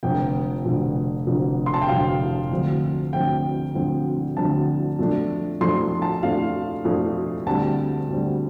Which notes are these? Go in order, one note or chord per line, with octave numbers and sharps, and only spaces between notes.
F1 F2 D3 G5
F1 F2 D3
F1 F2 D3
C6
A5
G5
F1 F2 D3 F5
D2 D3 F3 C4
D2 D3 F3 C4 G5
D2 D3 F3 C4
D2 D3 F3 C4 A5
F2 F3 A3 D4
F2 F3 A3 D4 C6
A5
F2 F3 A3 D4 F5
F2 F3 A3 D4
D2 D3 G3 C4 A5
D2 D3 G3 C4